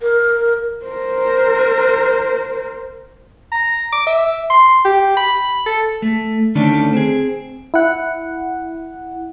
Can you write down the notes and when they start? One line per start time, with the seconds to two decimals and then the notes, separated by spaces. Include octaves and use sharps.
0.01 A#4
0.86 A#4 C5
3.52 A#5
3.93 D6
4.07 E5
4.50 C6
4.85 G4
5.17 B5
5.66 A4
6.02 A3
6.55 D3 D#3 A3 C#4 D4 A4
6.93 C4 G#4
7.74 E4 F#5